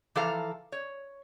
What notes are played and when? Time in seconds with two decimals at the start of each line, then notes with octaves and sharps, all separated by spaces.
0.16 E3 F3 A4 F5 A#5
0.72 C#5